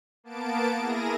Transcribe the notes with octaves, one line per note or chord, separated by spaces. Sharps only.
A#3 B3 A5 D7
E4 G#4 A#4 A#6 D#7